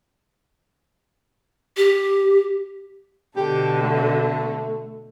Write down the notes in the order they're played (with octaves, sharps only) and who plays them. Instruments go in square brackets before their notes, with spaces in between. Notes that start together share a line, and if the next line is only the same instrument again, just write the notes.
[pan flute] G4
[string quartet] B2 D3 A4 [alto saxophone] G4
[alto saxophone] A3